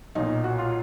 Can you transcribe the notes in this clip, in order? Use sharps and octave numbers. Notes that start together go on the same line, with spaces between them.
B1 A#2 D#4
F#4
F4